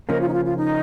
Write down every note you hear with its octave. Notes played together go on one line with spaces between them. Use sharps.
C#3 F3 A#3 C#4 A#4 D#5
F4
D#4
F4
F4
D#4